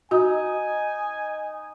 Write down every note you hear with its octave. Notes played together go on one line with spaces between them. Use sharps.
D#4 F#4 G#5